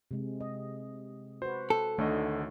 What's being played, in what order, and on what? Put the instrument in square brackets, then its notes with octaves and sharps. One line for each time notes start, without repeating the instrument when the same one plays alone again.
[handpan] C3 G#3
D#5
[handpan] F#4 B4 [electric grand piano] C5
[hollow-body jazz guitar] A4
[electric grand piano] D2 D3 D#5 [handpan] D#3 A3 C#5